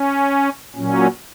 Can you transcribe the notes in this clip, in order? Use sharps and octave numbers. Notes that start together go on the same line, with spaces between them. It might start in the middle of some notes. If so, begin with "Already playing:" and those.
Already playing: C#4
A#2 F#3 C#4